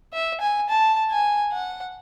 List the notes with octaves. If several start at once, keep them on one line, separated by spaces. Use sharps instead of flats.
E5
G#5
A5
G#5
F#5